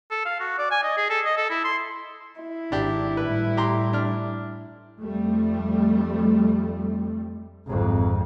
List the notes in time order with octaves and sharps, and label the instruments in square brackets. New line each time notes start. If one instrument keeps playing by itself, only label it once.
[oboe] A4
F5
F#4
D5
G#5
D#5
G#4
A4
D#5
A4
E4
C6
[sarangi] E4
[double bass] G#1 [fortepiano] D4 G4
[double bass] A2 G3 [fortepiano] B4
[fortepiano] G4 A#5 C6
D4 F6
[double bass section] F2 G3 A3
[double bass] G#1 F2